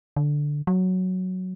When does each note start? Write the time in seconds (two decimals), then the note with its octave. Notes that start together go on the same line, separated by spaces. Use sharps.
0.16 D3
0.67 F#3